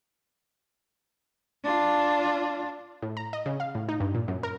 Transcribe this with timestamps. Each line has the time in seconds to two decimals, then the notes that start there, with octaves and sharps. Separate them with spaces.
1.64 D4 F4
3.02 A2
3.17 A#5
3.33 D#5
3.46 C#3
3.60 F5
3.75 A2
3.89 D#4
4.00 G2
4.15 A#2
4.28 F#2
4.43 A#4